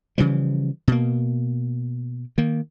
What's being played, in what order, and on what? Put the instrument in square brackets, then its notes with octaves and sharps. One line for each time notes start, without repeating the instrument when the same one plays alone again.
[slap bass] C#3 E3 F3 G3
B2 A#3
D#3 A#3